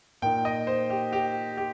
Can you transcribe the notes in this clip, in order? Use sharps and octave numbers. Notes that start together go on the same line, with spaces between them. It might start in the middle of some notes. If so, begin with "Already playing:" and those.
A#2 A#3 D#4 G5
D#5
C5
G4
G4
G4